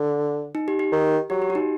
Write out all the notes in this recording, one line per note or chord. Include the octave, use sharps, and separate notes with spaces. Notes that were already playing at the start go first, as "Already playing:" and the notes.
Already playing: D3
D#4
G4
G4
D#3
F#3 G4
G4
F#4
D#4